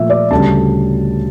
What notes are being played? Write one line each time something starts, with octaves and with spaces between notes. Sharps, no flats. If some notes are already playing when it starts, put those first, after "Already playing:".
Already playing: A#2 F3 A3 E5
D5
D2 C#3 G3 A5